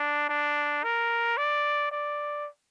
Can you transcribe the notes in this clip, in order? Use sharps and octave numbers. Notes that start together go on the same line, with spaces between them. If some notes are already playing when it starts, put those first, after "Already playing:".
Already playing: D4
D4
A#4
D5
D5